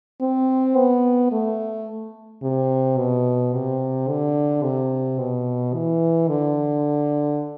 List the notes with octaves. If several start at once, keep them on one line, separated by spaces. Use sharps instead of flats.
C4
B3
A3
C3
B2
C3
D3
C3
B2
E3
D3